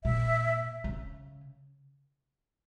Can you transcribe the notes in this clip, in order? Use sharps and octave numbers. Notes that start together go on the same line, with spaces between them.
A#2 E5
C#3